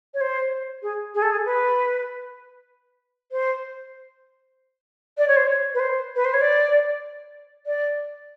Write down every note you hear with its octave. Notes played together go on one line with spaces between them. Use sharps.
C#5
C5
G#4
G#4
A4
G#4
B4
C5
D5
C#5
C5
C#5
B4
C5
B4
C5
C#5
D5
D5